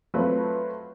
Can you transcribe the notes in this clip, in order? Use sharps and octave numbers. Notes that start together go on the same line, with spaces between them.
F#3 A3 C4 F4 B4